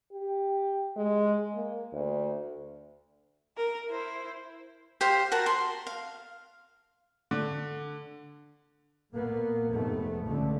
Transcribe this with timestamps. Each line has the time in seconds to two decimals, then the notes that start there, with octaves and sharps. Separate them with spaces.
0.12 G4
0.96 G#3
1.55 A#3
1.92 D2
3.57 A#4
3.90 E4 C5
5.01 G4 C5 F5
5.32 F#4 A#4 A5 A#5
5.46 C6
5.87 F5
7.31 D3
9.12 A#2 A#3 B3
9.71 F1 G#2 A3 B3
10.27 C#2 D3 A3